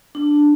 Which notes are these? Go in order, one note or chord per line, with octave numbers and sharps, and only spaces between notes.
D4